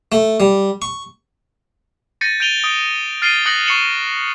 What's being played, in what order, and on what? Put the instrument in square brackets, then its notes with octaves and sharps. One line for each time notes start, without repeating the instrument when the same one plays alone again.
[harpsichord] A3
G3
C#6
[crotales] G6 A6 A#6 C#7 D#7
G6 D7 D#7 F7 G7
D#6 D7
F6 A6 C7 D7 D#7 G7
D#6 F#6 G6 A#6 C#7 F#7
C#6 C7 C#7 E7 F#7 G7